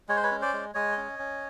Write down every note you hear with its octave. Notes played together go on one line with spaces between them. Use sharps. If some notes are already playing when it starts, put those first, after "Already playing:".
G#3 C#5
C5
B4 C#5
C#4
C5 D5
G#3
G#3 C#5 D#5
C#4
C#4